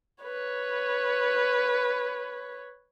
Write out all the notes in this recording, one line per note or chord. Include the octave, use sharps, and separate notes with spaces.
B4 C#5